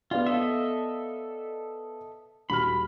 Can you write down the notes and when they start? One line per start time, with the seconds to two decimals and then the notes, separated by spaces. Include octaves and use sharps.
0.11 B3 F4 D5 F5
0.26 A4 D#5 E5
2.50 D#1 F#4 B5 F6